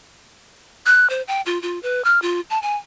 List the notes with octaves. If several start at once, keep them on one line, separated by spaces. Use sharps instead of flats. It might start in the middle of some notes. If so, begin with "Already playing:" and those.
F#6
C5
G5
F4
F4
B4
F6
F4
A5
G#5